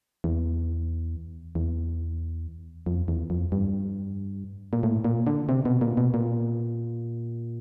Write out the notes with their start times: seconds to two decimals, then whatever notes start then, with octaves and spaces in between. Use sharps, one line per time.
0.24 E2
1.55 E2
2.86 F2
3.08 E2
3.30 F2
3.52 G2
4.73 A#2
4.83 A2
5.05 A#2
5.27 D3
5.49 C3
5.65 B2
5.81 A#2
5.97 B2
6.14 A#2